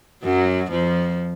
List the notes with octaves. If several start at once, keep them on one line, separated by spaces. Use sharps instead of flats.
F#2 F#3
F2 F3